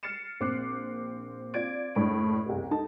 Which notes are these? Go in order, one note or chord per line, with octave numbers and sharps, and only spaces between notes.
F6 A6 C7 C#7 E7
A#1 C4 D6 F#6 C7
C4 F4 D5 G#6 A6 D7
F#1 A2 D4 D7
F#1 C2
D#4 A4 A5